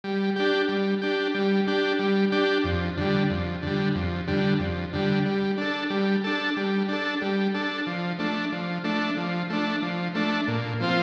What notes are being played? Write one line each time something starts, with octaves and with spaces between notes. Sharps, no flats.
G3
D4 G4
G3
D4 G4
G3
D4 G4
G3
D4 G4
F2
D3 G3
F2
D3 G3
F2
D3 G3
F2
D3 G3
G3
D4 A4
G3
D4 A4
G3
D4 A4
G3
D4 A4
F3
A3 D4
F3
A3 D4
F3
A3 D4
F3
A3 D4
A#2
F3 C4 F4